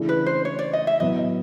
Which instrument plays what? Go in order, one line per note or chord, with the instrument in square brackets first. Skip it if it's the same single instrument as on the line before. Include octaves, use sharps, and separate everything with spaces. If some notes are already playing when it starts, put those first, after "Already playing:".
Already playing: [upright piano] C#3 E3 A3 D4
[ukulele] B4
C5
C#5
D5
D#5
E5
[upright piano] A2 F#3 B3 [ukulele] D#5